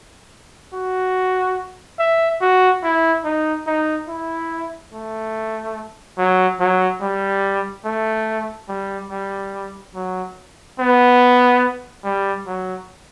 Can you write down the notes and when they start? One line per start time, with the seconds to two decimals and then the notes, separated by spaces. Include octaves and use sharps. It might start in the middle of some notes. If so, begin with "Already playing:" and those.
0.74 F#4
1.99 E5
2.41 F#4
2.83 E4
3.24 D#4
3.67 D#4
4.08 E4
4.92 A3
6.18 F#3
6.60 F#3
7.02 G3
7.85 A3
8.69 G3
9.11 G3
9.95 F#3
10.79 B3
12.04 G3
12.47 F#3